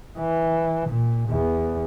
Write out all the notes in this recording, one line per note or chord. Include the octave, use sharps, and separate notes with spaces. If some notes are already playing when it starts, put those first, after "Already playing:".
E3
A#2
E2